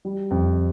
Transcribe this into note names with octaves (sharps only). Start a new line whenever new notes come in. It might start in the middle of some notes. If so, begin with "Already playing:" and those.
G3
F2